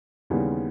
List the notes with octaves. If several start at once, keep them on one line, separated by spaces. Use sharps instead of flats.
D#2 C#3 E3 G3 B3